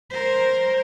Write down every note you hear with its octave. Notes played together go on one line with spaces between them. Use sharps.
A#4 C5